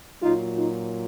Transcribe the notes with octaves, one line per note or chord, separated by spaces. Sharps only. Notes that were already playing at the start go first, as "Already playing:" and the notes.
A#2 F#3 D#4 F4
D#4 F4